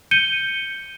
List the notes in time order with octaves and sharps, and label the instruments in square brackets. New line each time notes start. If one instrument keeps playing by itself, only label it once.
[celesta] G6 C#7 D#7 G7